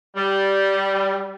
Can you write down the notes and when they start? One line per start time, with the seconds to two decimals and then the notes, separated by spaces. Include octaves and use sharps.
0.16 G3